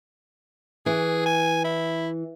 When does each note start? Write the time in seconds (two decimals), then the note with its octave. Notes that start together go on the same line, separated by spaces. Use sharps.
0.86 E3 G#4
1.26 G#5
1.64 E4